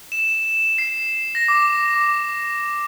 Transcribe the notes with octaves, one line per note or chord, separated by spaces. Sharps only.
E7
C7
A#6
D6
D6